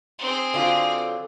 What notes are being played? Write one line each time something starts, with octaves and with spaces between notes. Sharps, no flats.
C4 G#4
D3 F#3 F4